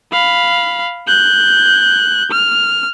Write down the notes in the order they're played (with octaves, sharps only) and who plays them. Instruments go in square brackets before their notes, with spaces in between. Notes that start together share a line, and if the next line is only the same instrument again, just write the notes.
[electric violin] F5 B5
F#6 G6
F6